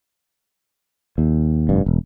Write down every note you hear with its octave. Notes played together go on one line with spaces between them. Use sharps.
D#2
F1 G2
E1